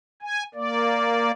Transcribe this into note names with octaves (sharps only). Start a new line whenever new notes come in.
G#5
A#3 D5